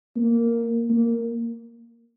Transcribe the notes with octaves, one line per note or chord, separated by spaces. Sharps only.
A#3
A#3